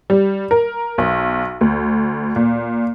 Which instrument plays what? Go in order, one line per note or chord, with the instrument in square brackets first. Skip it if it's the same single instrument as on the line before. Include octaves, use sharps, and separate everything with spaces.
[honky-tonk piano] G3
A#4
B1
D2
A#2